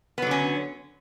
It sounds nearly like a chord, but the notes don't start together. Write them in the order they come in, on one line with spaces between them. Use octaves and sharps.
B3 F#3 D3 C#4